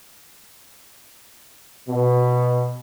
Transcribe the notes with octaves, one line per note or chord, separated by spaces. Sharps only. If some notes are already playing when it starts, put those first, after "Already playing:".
B2